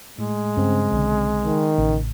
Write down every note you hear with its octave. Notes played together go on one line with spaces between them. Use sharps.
A2 G#3
G2 C#3 C4
B1 D3
D#3
A1 C#3